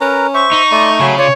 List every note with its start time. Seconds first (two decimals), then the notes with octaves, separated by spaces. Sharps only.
0.01 C#4 A#4 B4 A#5
0.34 C5 E5 C#6
0.53 D#4
0.71 A3 D5 C6
1.00 C#3 F#3 G#5 B5
1.18 F4 C#5 D5